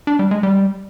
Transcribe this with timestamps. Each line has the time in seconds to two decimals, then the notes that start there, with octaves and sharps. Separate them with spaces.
0.07 D4
0.19 G3
0.31 G#3
0.43 G3